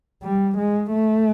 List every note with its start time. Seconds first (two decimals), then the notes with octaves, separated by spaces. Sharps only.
0.23 G3
0.58 G#3
0.92 A3